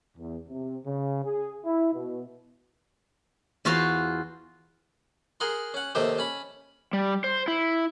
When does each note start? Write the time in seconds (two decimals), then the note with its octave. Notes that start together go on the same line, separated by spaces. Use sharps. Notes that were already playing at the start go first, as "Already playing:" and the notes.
0.18 E2
0.49 C3
0.86 C#3
1.25 G#4
1.65 E4
1.94 B2
3.65 E2 F4 F#4 C5 F5 C6
5.40 G#4 A#4 F#5 C6
5.74 C#4 F#5
5.95 D#2 C3 D#3 A3 G4 C5
6.19 C#4 B5
6.93 G3
7.24 C5
7.48 E4